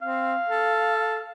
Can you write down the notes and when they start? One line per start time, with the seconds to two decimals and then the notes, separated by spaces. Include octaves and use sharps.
0.02 C4 F5
0.49 A4